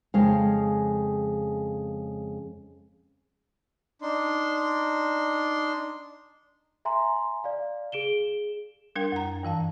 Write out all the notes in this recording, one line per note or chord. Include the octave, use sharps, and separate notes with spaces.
F2 C#3 G#3 F5
D4 D#4 C6
E5 G#5 A#5 C6
D5 F5
G#4 D7 E7 G7
G3 D4 A#4 G5
F#2 A#5
G2 E3 F5 A5